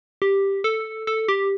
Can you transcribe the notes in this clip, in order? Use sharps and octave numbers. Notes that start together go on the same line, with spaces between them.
G4
A4
A4
G4